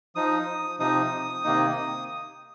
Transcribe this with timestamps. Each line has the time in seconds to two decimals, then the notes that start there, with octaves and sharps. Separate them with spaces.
0.15 F3 D#4 D#6
0.79 C3 F3 D#4 D#6
1.44 C3 D#3 A#3 D#4